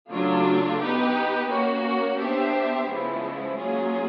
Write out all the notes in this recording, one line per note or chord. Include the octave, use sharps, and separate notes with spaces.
C#3 F#3 A3 D4 F4
B3 D#4 G4 B4
A#3 C#4 F#4
B3 D4 G4 C5 E5
C#3 F3 G#3 B3 E4
F#3 A#3 C#4 F4 G#4